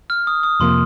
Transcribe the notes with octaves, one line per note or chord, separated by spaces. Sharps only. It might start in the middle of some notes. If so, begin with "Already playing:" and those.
F6
D#6
D#6
F2 C3 F3 A#3 C6